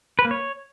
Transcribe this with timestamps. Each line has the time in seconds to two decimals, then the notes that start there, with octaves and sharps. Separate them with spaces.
0.19 B4
0.25 A#3
0.31 C#5